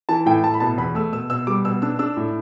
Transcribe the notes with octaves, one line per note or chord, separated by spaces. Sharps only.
E3 A5
A2 G5
A2 A5
B5
B2 A5
E2 B5
A3 E6
B2 E6
B2 E6
G3 D6
B2 E6
D4 E6
D4 E6
A2